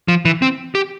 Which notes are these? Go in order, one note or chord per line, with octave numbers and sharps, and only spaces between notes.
F3
E3
C4
G4